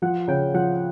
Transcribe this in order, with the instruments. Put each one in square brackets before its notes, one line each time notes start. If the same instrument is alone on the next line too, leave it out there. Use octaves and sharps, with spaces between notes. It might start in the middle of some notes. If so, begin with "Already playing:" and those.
[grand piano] F3 [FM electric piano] F#5
[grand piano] C#3 [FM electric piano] G5
[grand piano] F3 [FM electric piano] F#5